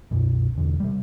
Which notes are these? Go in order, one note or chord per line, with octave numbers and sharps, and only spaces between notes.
C2 F#2 B2
E1 D3
C3 G3